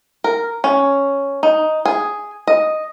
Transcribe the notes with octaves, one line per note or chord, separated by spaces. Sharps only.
A#4
C#4
D#4
G#4
D#5